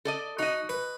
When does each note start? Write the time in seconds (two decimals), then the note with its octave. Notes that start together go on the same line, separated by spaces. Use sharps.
0.05 A4 D5 D#5
0.39 D#4 F#4 D#5
0.69 B4